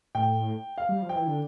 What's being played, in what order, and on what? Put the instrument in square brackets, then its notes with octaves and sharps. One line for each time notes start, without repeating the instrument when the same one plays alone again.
[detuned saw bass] A2 [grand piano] G5
[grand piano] F5
[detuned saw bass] G3
F3
[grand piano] G5
[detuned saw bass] E3
D3